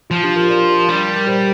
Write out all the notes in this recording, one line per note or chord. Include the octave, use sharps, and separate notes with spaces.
F3 F4
D4 G4
F4 A#4
A#4 D5
G3
A#4
G4 C5